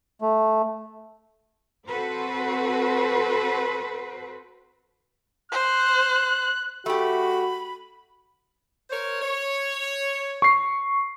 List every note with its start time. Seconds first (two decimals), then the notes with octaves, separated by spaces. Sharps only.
0.22 A3
1.87 C4 F#4 A4 B4 C5
5.52 C5 F#6
6.86 A3 F#4 G4 B5
8.90 A#4 C5 C#5
9.22 C#5
10.42 C#6 C7